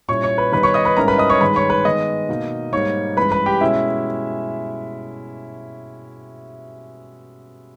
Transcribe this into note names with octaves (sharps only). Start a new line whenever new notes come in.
A#2 G3 C#4 E4 C#5 C#6
C#5 C#6
B4 B5
D#3 G3 B3 D#4 B4 B5
C#5 C#6
D#5 D#6
B4 B5
G#2 G3 C#4 E4 A#4 A#5
B4 B5
D#5 D#6
C#5 C#6
G2 D#3 G#3 B4 B5
C#5 C#6
B4 B5
D#3 G#3 B3 D#5 D#6
B2 A#3 D#4
G#2 G3 A#3 D#4 C#5 C#6
G2 E3 G#3 C#4 B4 B5
B4 B5
G4 G5
B2 G#3 C#4 E4 E5